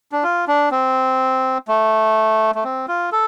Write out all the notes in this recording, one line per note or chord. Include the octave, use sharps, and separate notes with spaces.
D4
F4
D4
C4
A3
A3
C4
F4
A4